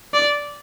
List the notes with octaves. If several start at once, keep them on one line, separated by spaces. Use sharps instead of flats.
D5